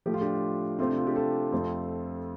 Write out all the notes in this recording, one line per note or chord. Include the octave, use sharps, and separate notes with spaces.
A2 F3 A3 G4
F4
D4 G4
C3 A3 C4 F4
D4
F4
D4 G4
F4 A4
F2 F3 A3 C4